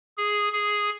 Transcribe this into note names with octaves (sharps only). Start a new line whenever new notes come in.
G#4
G#4